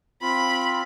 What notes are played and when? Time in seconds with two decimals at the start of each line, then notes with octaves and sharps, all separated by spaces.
0.22 C4 F4 B5